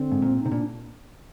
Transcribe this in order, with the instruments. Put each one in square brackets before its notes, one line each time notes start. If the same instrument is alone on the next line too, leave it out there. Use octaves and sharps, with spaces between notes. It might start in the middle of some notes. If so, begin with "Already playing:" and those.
Already playing: [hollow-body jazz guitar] D3 [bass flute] C4
[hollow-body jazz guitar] G#2
A#2
[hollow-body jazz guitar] C3 [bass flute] D#4
[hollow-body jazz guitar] A#2 [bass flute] D4